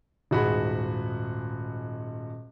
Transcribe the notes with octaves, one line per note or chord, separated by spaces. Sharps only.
D#1 G#2 F#4 G#4 B5